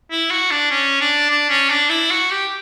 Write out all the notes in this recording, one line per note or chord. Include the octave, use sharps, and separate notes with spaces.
E4
F#4
D4
C#4
D4
D4
C#4
D4
E4
F#4
G4